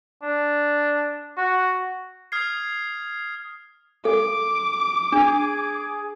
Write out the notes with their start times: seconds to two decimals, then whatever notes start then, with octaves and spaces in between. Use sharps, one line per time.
0.22 D4
1.37 F#4
2.32 D#6 F6 G#6 C7
4.05 A4 D6
5.12 D4 G#4